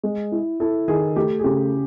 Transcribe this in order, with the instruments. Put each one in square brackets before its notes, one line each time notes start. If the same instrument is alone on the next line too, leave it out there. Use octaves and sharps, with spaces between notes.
[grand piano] G#3
E4
[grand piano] E4 [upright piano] A4
[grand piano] D#3 [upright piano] G#4
[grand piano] A3 [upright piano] G4
[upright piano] G#4
[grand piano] C#3 [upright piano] G4